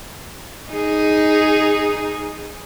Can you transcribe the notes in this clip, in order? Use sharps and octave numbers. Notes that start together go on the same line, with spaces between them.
D#4 G#4